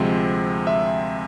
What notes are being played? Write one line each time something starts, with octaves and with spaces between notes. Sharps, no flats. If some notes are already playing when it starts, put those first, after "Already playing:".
Already playing: D2 C3 F3 G#3 C4
E5